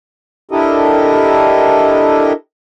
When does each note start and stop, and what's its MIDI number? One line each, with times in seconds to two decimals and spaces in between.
0.51 2.33 62
0.51 2.33 64
0.51 2.33 67
0.51 2.33 69
0.51 2.33 70
0.51 2.33 75